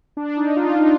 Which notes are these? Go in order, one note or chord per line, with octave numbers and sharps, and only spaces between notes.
D4
D#4
F4
D#4